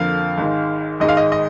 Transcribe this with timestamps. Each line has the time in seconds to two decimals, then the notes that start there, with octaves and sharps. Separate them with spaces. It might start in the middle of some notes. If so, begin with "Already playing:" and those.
Already playing: F2 D3 F3 A#3 F5
0.38 G#1 G#2 D#3 G#3
1.00 G#1 G#2 D#3 G#3 D#5
1.08 F5
1.17 D#5
1.32 D#5